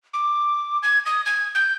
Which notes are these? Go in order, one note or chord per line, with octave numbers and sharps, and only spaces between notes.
D6
G#6
D#6
G#6
G6